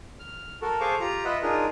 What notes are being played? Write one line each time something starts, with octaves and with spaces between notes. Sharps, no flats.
F6
F#4 A4 A#4
G#4 A4 C5 F5 C#6 D6
F4 G4 A#5
F4 B4 D#5 E5 F#5
D4 D#4 F4 G#4 A#4